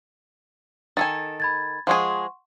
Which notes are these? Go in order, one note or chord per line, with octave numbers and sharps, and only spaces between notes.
D#3 A4 G#5 A6
B5 G#6 A6
F3 G#3 G#4 F#5 C6 C#6